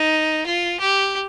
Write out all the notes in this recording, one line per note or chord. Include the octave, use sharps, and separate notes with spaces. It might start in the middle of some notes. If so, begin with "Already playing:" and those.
Already playing: D#4
F4
G4